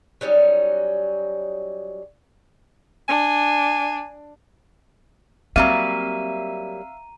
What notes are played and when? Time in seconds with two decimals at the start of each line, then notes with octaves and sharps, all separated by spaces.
0.21 F#3 G3 C#4 D#4
3.08 D4 G#5
5.56 F#3 G3 A#3 C4 E5 F5 A#5 D#7